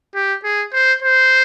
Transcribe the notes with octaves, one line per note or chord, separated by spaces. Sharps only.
G4
G#4
C5
C5